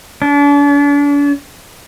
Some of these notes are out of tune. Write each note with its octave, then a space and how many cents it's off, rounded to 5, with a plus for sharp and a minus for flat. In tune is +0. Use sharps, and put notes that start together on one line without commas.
D4 -40